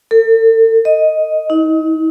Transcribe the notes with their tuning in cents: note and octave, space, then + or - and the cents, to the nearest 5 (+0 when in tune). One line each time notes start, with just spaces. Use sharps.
A4 +40
D#5 +5
D#4 +40